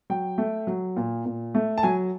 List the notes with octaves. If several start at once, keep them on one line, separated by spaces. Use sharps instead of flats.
F#3 G5
A3
F#3
A#2
A#2
A3
A5
F#3 G#5